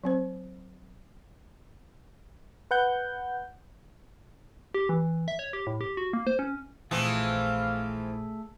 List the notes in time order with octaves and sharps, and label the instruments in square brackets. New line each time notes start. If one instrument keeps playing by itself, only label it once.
[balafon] F#3 C4 C5
[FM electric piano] B4 F#5 G6
[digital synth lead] G4
E3
E5
C#5
G4
A2
G4
F#4
A#3
C5
C#4
[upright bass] A#1 [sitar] E3 F3 C4 [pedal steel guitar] A3 G#4 [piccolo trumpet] F5